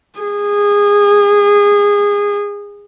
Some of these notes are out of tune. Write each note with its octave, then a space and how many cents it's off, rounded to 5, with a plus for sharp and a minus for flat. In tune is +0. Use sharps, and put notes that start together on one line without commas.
G#4 -25